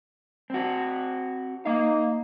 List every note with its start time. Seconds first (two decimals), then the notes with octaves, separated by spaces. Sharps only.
0.50 C4 F#4
1.66 A#3 D#4 F5